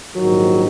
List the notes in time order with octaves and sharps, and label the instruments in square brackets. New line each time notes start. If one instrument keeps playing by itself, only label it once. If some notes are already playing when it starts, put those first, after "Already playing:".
[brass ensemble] A#1 G#2 D#3 F#3